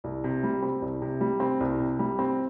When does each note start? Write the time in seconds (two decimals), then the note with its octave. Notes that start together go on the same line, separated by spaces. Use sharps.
0.04 C2
0.24 C3
0.43 G3
0.63 C4
0.82 C2
1.02 C3
1.21 G3
1.40 C4
1.60 C2
1.79 C3
1.99 G3
2.19 C4